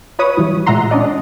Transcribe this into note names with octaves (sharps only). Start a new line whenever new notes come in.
F4 B4 C#5 B5 D#6
E3 F#3 G3 E4
A#2 G#3 E5 F#5 A#5 C6
C#4 D4 D5 D#5 F#5